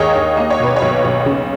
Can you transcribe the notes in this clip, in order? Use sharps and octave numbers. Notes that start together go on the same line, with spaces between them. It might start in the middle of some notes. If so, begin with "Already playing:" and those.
Already playing: D#2 D#3 G#3 G#4 A#4 C#5 D#5
D#2
A#3 D#5
C#5
B2 B4
C#5
B1
B1
C#3